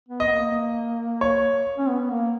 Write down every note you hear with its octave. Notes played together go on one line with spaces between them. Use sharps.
B3
D#5
B3
A#3
C#5
C#4
B3
A#3